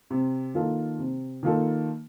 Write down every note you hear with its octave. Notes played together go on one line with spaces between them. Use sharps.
C3
D#3 A#3 F4 A4
C3
D#3 A#3 F4 A4